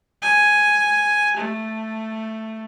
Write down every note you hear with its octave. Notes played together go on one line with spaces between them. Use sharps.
G#5
A3